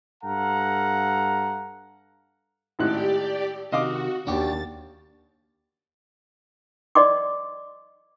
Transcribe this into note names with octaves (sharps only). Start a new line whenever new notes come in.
G2 A4 F5 F#5 A#5
G#1 A2 G4 D5 F#6
C3 D#3 F#4 D#5 F5 D6
D#2 D4 F#4 G4 A6
D5 D#5 C6 D6